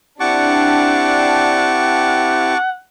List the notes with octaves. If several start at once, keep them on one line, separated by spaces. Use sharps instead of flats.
C4 D4 E4 G4 F#5 A5 C#6 D6